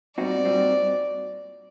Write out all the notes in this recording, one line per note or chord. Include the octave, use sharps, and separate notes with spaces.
A#2 G3 C4 D#4 F#4 D5
A#2 G3 C4 D#4 F#4